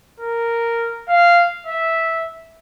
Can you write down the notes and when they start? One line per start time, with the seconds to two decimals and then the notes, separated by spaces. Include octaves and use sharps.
0.20 A#4
1.09 F5
1.67 E5